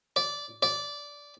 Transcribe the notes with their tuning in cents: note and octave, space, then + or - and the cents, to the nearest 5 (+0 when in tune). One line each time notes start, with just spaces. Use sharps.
D5 -15
D5 -15